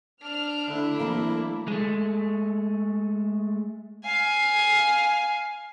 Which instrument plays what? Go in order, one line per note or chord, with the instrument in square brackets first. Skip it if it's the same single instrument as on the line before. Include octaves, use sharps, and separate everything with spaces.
[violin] D4 [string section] F6
[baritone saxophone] D3 [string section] A3 E4
[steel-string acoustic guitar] E3 F#3 C4 [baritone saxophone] A#3
[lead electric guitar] G#3 A3
[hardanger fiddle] F5 G#5